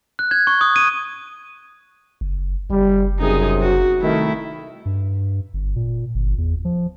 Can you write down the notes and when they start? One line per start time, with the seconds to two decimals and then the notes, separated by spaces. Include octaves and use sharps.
0.19 F#6
0.31 G#6
0.47 C#6
0.61 D#6
0.76 D#7
2.21 F#1
2.70 F#1 G3
3.19 F#2 C3 D#4 G#4
3.61 F#4
4.02 C2 D#3 A3 E4
4.85 G2
5.54 G1
5.76 A#2
6.15 G1
6.38 E2
6.65 F3